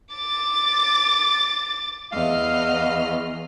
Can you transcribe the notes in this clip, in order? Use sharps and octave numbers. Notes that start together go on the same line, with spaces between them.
D6 A6
E2 D#5 F5 F6